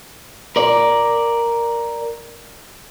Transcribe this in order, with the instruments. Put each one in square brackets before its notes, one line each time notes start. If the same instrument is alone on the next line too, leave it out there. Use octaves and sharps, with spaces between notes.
[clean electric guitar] A#4 D5